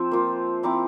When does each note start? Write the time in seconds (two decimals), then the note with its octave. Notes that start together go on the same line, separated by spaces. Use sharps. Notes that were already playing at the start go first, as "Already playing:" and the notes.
Already playing: F3 C4 C5 E5
0.11 A#3 F4
0.63 F3 C4 E4 A#5 D6